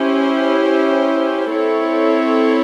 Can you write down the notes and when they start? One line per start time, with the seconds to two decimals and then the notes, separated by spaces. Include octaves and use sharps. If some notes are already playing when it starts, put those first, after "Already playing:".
Already playing: C#4 E4 G4 C5
1.51 C4 E4 A4 C#5